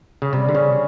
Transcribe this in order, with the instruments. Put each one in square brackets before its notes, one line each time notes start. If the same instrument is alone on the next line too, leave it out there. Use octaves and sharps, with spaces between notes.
[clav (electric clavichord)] C#3
[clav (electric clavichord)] C3 [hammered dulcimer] G3
[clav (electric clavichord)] D3
[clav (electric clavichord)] C#3 [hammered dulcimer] C#4